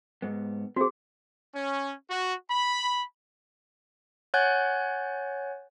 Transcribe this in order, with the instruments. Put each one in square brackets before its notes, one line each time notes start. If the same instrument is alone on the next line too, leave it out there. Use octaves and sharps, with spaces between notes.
[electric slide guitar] G#2 B3
[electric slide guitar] C4 [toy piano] F#4 G#4
[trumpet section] C#4
F#4
B5
[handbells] C#5 F#5 G#5 F#6 G6 A6